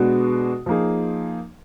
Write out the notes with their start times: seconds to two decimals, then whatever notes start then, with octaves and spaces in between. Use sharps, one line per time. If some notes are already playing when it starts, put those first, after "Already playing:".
Already playing: B2 G#3 B3 D4 F#4
0.66 F3 A#3 D#4 G#4